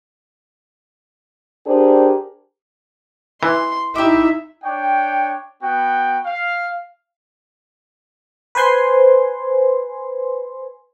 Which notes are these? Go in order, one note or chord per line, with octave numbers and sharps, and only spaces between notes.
D4 G4 G#4 A#4 C5
E3 C6
D#4 E4 G4 E5 D6
D4 C#5 G5
B3 F#4 G5
F5
B4 C5 G#5 C6